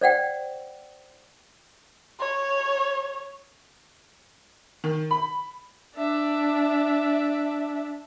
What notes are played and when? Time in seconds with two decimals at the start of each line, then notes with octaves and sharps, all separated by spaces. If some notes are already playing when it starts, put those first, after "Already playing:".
0.01 C5 D5 F#5 G5
2.20 C#5
4.84 D#3
5.11 B5
5.96 D4 E5